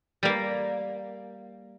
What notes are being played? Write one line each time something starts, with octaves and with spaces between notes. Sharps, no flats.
G3 A#3